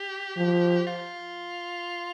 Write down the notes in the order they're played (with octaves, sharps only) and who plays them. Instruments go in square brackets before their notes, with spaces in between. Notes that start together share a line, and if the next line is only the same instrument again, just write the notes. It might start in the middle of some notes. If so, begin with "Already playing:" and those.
Already playing: [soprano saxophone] G4
[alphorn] F3
[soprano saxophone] F4